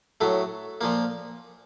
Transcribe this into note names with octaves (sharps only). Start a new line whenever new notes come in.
A2 F#3 A3
A#2 F3 A#3